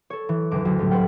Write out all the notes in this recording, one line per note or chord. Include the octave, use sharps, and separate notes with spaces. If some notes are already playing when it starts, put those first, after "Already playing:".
A4 C#5
E3
F#1 D2 D6 E7
D2 F#3
A2 D3 G3 A3
B4 C5 F#5 G5